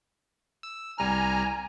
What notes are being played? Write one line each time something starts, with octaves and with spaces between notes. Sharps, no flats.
E6
C2 G3 G#5 A#5 F6